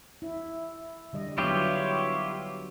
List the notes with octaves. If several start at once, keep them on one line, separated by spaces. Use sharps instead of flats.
E4
D3 G3 D#5
D3 F#3 B3 E4 F4 G4 C#5